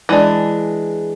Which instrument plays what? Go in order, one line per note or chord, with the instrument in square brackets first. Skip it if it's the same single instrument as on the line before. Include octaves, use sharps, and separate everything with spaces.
[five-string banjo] E3 G#3 D4